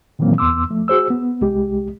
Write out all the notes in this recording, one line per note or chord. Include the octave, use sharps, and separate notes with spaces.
A#2 D#3 E3 F#3 A#3 C4
E2 B3 C6 D6 E6
F3 A3
F#4 G#4 C5 E6
B3
C2 G#3 G4